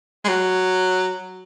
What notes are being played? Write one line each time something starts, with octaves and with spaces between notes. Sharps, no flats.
G#3
F#3